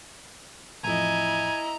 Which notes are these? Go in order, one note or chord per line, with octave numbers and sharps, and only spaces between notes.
A1 F2 E4 D#5 G#5 A#5